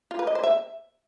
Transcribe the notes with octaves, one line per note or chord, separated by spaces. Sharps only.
F4
B4
D#5
C5
E5